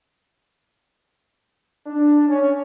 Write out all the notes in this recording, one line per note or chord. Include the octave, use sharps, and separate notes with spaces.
D4
C#4